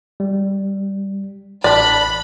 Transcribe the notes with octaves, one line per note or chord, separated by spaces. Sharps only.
G3
A1 D4 D5 B5